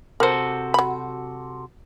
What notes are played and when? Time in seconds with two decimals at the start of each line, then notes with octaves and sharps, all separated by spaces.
0.20 C3 F#4 A4 A#4 C5
0.74 F#3 B5